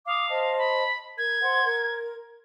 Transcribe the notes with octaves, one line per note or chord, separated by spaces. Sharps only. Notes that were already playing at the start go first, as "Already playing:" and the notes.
F5 D6 D#6
C5 D#5 A5
B5
A#4 G#6
C5 F#5 C6
A#4